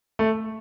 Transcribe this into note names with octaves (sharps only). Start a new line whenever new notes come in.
A3